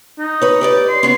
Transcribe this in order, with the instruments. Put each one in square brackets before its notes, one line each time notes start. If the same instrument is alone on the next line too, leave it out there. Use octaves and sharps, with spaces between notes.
[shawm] D#4
[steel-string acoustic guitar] B4 C#5
G4 B4 D5
[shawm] C6
[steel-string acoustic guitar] C#3 B3 C#4